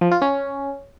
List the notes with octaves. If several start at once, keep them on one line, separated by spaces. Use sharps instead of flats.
F3
F4
C#4